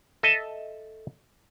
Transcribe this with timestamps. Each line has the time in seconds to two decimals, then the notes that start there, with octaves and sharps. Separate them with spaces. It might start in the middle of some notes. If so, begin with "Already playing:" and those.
0.23 A4 D#5 E5 A5